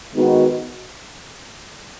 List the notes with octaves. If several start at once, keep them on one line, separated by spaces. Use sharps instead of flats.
D#3 G#3 B3 D#4 F#4